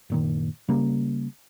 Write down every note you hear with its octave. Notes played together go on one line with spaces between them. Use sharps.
F#1 A#2 D#3
C#3 G3 A#3